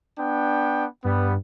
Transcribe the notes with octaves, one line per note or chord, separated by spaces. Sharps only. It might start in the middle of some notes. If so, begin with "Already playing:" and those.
B3 D4 G5
G2 G3 B3